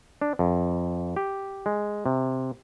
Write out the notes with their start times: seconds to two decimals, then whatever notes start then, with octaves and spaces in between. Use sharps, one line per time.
0.22 D4
0.39 F2
1.16 G4
1.66 G#3
2.06 C3